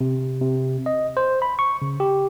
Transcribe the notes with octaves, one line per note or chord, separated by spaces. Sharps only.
C3
C3
D#5
C5
B5
C#6
C#3
G4